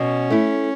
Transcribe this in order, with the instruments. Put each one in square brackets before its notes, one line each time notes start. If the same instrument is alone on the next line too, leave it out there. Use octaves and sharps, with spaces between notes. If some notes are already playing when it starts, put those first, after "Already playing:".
Already playing: [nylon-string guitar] B2 [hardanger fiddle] C#4
[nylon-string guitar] A3 E4